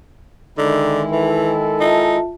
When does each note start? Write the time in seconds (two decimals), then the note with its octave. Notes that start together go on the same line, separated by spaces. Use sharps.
0.58 D3 D#3 G#3 D#4 E4
1.12 E3 A4
1.80 D#4 F4 E5 A5